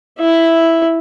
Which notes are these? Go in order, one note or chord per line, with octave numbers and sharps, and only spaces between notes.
E4 E5